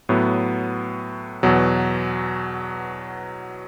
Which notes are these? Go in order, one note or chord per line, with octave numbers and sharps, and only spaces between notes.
A2 F#3 B3
E2 B2 F#3